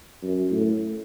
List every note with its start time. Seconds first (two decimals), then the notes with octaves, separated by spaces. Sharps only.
0.23 F#2
0.51 A2